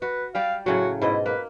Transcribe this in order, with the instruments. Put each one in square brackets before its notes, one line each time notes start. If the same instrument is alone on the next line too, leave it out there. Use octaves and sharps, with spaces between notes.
[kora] F#4 [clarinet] B4
[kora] G3 G4 D5 [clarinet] F5
[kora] A2 C#3 F#3 [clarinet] F#4
[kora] G#2 B2 D#5 [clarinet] E4
[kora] A#3 [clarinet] B4